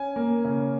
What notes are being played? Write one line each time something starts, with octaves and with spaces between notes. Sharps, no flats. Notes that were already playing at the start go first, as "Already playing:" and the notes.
Already playing: C#4 G#5
A#3
C#3